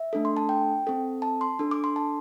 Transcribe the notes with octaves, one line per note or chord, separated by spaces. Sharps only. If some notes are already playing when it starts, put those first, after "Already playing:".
Already playing: E5
A3 D4 A4
C6
A5
G5
C4 A4
A5
C6
D4 A4
D6
C6
A5